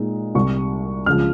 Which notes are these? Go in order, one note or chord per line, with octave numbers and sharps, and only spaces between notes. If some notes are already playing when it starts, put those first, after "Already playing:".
Already playing: A#2 G#3 D#4
C2 C3 G3 C#6
C#2 C#3 F3 F6